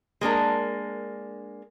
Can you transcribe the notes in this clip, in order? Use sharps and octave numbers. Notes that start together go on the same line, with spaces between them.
G#3 A#3 D4 A#4